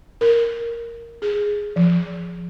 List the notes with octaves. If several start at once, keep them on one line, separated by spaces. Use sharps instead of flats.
A#4
G#4
F3